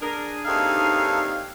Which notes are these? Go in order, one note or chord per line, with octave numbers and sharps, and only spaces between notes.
D4 G#4 A#4
D#2 C4 D#4 A4 E5 F5